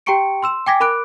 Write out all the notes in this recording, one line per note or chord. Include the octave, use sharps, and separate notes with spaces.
G4 G5 A#5 C#6 C#7 D7
C6 E6 E7
G5 G#5 D6 G#6 A#6 B6
A#4 B5 D6 F#6 D7